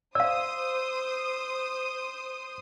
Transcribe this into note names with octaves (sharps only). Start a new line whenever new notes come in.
C5 D5 F5 D#6 E6